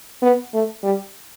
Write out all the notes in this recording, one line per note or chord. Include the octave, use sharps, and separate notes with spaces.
B3
A3
G3